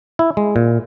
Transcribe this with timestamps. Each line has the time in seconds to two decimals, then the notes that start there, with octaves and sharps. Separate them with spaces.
0.19 E4
0.37 G#3
0.56 A#2